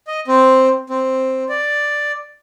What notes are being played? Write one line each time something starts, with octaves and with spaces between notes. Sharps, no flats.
D#5
C4
C4
D5